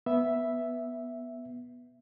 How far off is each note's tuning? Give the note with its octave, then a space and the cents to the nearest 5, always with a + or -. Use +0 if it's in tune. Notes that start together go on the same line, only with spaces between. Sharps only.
B3 -5 E5 +0